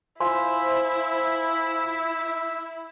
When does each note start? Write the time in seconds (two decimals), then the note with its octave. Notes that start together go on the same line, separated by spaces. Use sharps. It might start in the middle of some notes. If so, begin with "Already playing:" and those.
0.20 E4 F4 C5 E5 F5 G#5